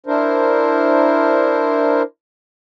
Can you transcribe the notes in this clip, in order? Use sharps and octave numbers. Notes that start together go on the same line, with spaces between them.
D4 E4 A#4 C5